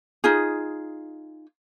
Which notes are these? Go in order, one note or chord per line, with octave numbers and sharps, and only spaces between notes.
D#4 F4 G#4